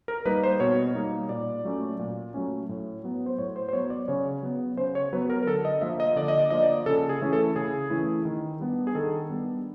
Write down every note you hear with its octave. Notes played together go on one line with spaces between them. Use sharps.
A#4
G3 A#3 D#4 B4
C5
B2 C#5
G3 A#3 D#4
A#2 D5
F#3 A3 C#4
A#2
F#3 A3 C#4
A2
F#3 B3
C5
A2 C#5
C5
C5
F#3 B3 C#5
D5
C#3 C#5
F#3 B3
C#3 C5
C#5
F#3 B3 B4
A#4
A#4
D3 A4
D#5
F3 A#3 E5
D#5
D3 D5
D#5
D5
F3 A#3 D#5
D5
C#3 A4
G#4
E3 A3 C#4 E4
A4
C#3 G#4
E3 A3 C#4 E4
D#3
G3 B3 D4
G#4
D#3 A4
G3 B3 D4